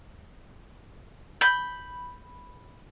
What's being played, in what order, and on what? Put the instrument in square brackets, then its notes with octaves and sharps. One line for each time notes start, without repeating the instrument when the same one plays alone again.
[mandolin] B5 G6